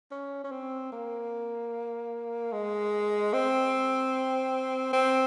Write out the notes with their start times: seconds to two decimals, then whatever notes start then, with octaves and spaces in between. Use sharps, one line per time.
0.11 C#4
0.44 C#4
0.51 C4
0.92 A#3
2.52 G#3
3.33 C4
4.93 C4